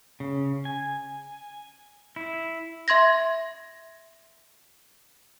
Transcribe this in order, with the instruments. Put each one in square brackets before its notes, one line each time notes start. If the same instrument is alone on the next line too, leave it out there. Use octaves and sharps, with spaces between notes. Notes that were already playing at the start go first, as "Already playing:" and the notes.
[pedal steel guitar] C#3
G#5
E4
[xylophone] E5 C6 G#6 A#6